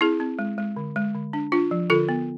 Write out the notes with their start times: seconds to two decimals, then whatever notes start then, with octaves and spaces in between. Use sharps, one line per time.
0.01 C4 E4 G#4
0.20 C4
0.39 G#3
0.58 G#3
0.76 D3
0.96 G#3
1.15 D3
1.33 D4
1.52 D4 F4
1.71 F3
1.90 D3 F4 A4
2.09 B3